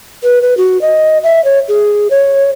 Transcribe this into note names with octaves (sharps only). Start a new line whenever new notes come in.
B4
B4
F#4
D#5
E5
C#5
G#4
C#5